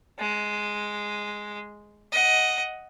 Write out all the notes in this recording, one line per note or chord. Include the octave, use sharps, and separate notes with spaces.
G#3
D#5 F#5